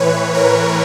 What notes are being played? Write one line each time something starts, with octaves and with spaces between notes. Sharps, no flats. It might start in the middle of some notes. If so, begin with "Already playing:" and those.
Already playing: A2 E3 B4 C#5
A#4